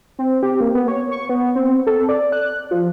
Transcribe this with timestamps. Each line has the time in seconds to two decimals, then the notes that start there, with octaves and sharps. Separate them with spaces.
0.19 C4
0.43 G4
0.61 A#3
0.75 B3
0.88 C#5
1.11 C#6
1.29 B3
1.55 C4
1.87 A4
2.09 D5
2.32 F#6
2.71 F3